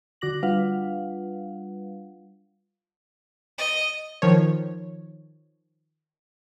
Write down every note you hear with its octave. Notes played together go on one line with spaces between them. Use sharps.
D3 F#4 D6 A#6 F#7
G3 D4 F4 B4 F5 F#5
D#5
D#3 F3 C#5